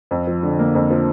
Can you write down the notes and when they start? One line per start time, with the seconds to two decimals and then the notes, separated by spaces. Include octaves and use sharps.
0.11 F2
0.27 F3
0.43 D3
0.59 A#3
0.75 F2
0.90 F3